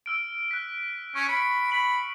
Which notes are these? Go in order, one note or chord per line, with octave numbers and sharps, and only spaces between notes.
E6 F6 D7
F#6 B6
C#4 C#6
B5 C#7 D7
B5 F#7